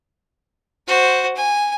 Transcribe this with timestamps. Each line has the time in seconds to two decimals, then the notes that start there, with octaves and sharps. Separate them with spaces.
0.87 F#4 C5
1.36 G#5